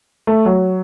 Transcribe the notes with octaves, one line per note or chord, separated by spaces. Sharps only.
A3
F#3